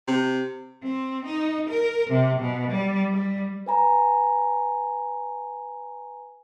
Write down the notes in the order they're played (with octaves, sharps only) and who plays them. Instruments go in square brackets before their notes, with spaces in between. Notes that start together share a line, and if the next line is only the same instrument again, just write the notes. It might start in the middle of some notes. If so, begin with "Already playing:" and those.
[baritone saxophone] C3
[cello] C4
D#4
A#4
C3
B2
G3
G3
[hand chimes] B4 G#5 A#5